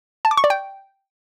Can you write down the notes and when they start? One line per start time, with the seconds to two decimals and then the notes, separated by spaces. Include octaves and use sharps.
0.25 A5
0.31 D6
0.37 C#6
0.44 D5
0.50 G5